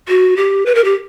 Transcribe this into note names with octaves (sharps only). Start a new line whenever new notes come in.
F#4
G4
B4
A#4
G4